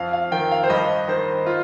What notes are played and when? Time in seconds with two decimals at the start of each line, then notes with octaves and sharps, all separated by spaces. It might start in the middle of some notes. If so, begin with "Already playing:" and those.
Already playing: F2 F5
0.13 F5
0.31 D#3 G5
0.51 F5
0.64 C5
0.70 G2 D#5
1.08 D#3 C5
1.46 F4